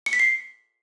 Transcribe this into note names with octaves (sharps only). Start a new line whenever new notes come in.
C#7
B6
C7